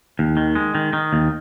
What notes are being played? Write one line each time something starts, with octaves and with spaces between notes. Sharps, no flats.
D#2
D#3
G#3
D#3
D#3
D#2